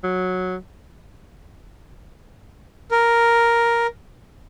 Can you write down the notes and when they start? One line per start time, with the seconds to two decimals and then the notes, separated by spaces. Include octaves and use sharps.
0.04 F#3
2.91 A#4